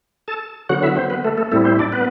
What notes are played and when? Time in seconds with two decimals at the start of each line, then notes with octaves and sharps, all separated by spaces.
0.28 A4 A5
0.69 D3 F#3 B3 F#4 F#5
0.83 E4 E5
0.96 C4 C5
1.10 B3 B4
1.24 A3 A4
1.38 A3 A4
1.51 A2 G3 A3 C4 E4 A4
1.65 C4 C5
1.79 D4 D5
1.92 B3 B4